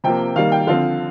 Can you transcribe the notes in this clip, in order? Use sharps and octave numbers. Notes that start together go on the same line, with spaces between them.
C3 F3 A#3 G5
D#3 G3 A#3 F5
G5
D3 F3 C4 F5